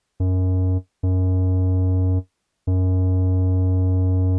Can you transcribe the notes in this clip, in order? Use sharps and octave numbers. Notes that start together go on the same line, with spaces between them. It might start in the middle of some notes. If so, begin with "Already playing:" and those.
F#2
F#2
F#2